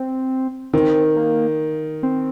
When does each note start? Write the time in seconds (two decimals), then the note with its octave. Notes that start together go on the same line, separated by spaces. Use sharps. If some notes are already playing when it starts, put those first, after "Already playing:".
Already playing: C4
0.73 D#3 C4
1.16 A#3
2.03 C4